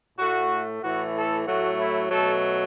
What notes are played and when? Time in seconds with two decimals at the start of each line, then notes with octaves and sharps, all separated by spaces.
0.18 A2 A3 F#4
0.82 A2 E3 A3 F#4
1.15 A4
1.46 A2 F#3 A3 F#4
1.79 E4
2.10 B2 F#3 A3 A4